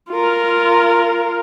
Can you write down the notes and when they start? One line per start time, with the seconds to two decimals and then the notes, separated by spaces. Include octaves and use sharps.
0.11 F4 A#4